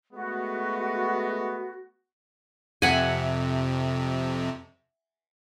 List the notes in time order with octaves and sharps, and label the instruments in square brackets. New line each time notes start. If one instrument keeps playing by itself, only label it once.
[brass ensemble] G#3 A3 B3 [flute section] F#4
[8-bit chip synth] F2 C3 [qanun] E5 F#5 G#5